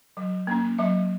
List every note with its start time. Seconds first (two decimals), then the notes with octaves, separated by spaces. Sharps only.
0.17 F#3
0.47 A#3 C#4
0.79 F#3 E5